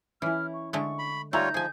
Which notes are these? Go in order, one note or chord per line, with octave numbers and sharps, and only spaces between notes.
E3 C#4 E4 F6
C#6
D3 G#3 A3 C#6
B5
G3 A3 D#4 F4 C#5 A#5 G6
F3 G#4 G#5